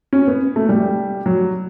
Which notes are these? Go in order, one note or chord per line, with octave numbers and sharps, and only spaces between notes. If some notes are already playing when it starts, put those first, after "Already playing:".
C#4
B3
A3
G3
F#3